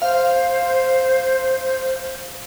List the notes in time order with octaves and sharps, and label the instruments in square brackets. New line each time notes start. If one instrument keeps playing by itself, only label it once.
[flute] C5 [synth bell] F5